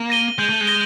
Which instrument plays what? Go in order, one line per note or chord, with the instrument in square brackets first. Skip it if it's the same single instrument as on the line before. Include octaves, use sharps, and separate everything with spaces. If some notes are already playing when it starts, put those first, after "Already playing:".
Already playing: [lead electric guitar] A#3
[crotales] A#6 D#7 G7
[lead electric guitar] G#3 [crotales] G6
[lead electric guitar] A3
G#3
[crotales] A#6 D#7 G7